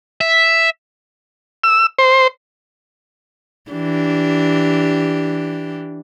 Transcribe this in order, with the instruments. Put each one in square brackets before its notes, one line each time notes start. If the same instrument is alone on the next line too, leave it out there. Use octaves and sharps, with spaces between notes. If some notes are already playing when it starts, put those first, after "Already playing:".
[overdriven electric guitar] E5
[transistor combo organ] E6
C5
[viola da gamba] E3 D4 G4